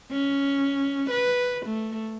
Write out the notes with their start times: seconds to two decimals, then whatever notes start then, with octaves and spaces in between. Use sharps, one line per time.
0.12 C#4
1.10 B4
1.66 A3